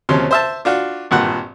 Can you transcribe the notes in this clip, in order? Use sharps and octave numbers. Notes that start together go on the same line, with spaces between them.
D#2 C3 F3 C#4 C6
C5 E5 A5
D4 F4 F#4
G#1 G2 A#2 F#5